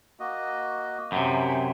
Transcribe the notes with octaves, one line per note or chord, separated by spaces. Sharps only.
A#3 F#4 D#5
F#2 C3 G5 G#5 B5